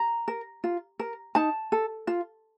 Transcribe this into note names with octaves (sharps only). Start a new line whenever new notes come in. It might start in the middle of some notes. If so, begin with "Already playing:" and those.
Already playing: A#5
A#4
F4
A#4
D#4 A5
A4
F4